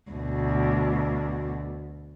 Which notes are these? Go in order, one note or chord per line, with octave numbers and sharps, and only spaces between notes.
D2 B2